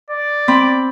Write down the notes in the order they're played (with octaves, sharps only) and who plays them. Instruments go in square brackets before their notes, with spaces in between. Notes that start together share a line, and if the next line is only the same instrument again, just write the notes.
[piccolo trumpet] D5
[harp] C4 B5